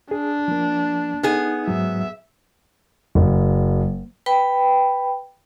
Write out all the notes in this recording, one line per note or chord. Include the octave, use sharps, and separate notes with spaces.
D4 G#4
F3 A#3
B3 D#4 G#4
G#2 F#3 E5
F#1
B4 G5 B5